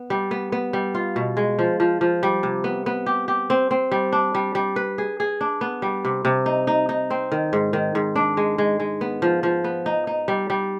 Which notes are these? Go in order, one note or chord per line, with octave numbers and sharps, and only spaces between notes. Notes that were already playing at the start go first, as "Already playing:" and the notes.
Already playing: B3
G3
B3
B3
G3
F4
B2
G#3
F3
F3
F3
G3
C3
B3
B3
G4
G4
C4
C4
G3
D4
G3
G3
B4
G#4
G#4
D4
B3
G3
C3
C3
D#4
D#4
D#4
C4
D#3
G#2
D#3
G#2
D4
G#3
G#3
G#3
B3
F3
F3
B3
D#4
D#4
G3
G3